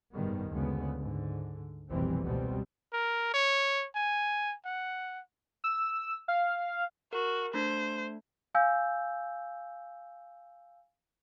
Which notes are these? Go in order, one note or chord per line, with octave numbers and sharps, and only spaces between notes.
F#1 G#2 B2 D#3 G3 B3
D2 C#3 G#3 B3
G#2 D3
F1 A#1 B2 E3 G3 C4
C#2 B2 G3 B3 C4
A#4
C#5
G#5
F#5
E6
F5
F#4 A#4
A3 D4 C5
F5 G#5 E6 G6